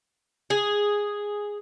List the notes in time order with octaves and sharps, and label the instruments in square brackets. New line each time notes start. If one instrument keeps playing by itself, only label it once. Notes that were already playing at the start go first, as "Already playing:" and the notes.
[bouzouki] G#4